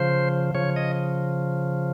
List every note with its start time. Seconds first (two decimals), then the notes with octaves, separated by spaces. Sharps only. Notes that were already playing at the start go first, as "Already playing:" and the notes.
Already playing: C#3 F3 C5
0.55 C#3 F3 C#5
0.76 D#5